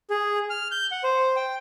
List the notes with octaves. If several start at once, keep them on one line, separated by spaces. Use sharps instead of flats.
G#4
F6
G6
F#5
C5
G5